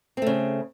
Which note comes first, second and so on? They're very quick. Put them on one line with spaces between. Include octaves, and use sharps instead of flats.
C4 A3 C#3